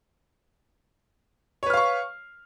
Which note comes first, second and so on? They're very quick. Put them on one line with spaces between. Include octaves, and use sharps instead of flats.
C#5 B4 F6 F5 C#6